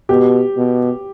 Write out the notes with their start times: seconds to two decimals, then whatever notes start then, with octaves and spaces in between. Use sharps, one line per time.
0.09 B2 G4
0.57 B2